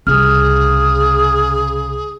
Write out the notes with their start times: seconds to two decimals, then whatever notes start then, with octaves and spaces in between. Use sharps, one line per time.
0.07 C2 C#3 G#4 F6